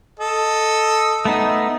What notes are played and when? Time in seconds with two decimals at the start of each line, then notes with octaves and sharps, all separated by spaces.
0.20 A4 D#5
1.25 A3 B3 D#4